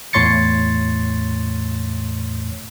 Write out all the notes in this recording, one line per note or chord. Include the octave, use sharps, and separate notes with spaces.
E2 A2 C#5 C6 A6 C#7